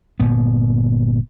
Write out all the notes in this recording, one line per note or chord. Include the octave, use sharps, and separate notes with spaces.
G1 A#2 B3